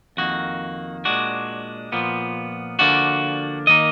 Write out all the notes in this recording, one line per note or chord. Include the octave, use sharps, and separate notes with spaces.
F2 D#3 A#3 F#4
A#2 G#3 D4 F#4
A#2 F3 B3
D3 F3 A#3 D4 F#4
D#3 A#3 D#4 D#5